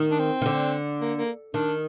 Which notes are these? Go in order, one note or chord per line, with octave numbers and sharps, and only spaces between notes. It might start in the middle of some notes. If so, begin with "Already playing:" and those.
Already playing: D#3
D4
C4
D#3
D3
A#3
A#3
D#3 D4